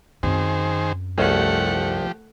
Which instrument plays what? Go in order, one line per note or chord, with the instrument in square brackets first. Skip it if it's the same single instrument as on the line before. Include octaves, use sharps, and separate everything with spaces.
[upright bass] F#2 C4 [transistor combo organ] D#3 G#4 C5
[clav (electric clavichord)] C2 C#4 G#4 [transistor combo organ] F3 G4 [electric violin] A3 F#5